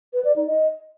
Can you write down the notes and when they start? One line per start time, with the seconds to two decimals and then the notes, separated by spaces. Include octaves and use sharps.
0.13 B4
0.24 D5
0.36 D#4
0.47 D#5